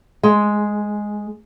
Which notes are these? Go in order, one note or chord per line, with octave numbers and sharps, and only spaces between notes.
G#3